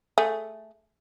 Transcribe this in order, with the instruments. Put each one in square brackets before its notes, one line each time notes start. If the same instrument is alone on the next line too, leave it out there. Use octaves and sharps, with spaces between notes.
[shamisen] A3 G#4